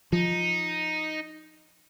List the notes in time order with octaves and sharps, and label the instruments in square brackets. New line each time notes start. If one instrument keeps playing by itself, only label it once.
[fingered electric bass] F3 [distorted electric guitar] D#4